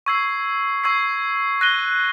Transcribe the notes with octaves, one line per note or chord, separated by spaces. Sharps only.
C#6 E6 G#6 C7
C#6 E6 G#6 C7
F#6 A#6 D#7 G7